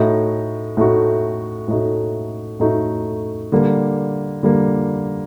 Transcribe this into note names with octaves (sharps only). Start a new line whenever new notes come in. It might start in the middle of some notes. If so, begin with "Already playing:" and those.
Already playing: A2 A3 D#4 F#4
A2 A3 D#4 F#4
A2 A3 D#4 F#4
A2 A3 D#4 F#4
D3 G3 A#3
D3 G3 A#3